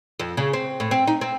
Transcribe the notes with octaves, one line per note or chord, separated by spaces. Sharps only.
F2
C#3
C4
A2
C4
D#4
C4